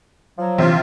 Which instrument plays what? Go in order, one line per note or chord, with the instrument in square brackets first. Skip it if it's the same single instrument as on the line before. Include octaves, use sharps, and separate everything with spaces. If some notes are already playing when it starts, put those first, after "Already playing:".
[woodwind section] F3 F#3
[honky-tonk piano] A#1 C3 [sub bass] E3 [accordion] F4